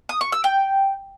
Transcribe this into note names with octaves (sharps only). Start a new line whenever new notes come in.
D#6
C#6
E6
G5